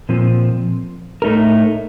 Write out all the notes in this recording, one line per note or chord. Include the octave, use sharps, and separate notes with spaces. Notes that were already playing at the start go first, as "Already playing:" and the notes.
A#2 F3 C4
A2 A3 D#4 A#4